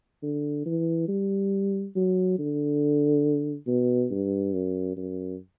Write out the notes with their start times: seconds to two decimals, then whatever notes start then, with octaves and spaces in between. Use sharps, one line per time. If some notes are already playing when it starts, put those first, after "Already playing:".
0.23 D3
0.66 E3
1.08 G3
1.95 F#3
2.39 D3
3.67 B2
4.11 G2
4.53 F#2
4.97 F#2